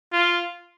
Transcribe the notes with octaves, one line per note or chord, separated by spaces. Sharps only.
F4